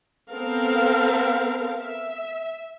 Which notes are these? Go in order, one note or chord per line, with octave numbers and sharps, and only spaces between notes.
B3 C4 A4 A#4 F5
E5